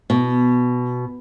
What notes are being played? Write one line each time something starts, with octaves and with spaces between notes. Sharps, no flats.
B2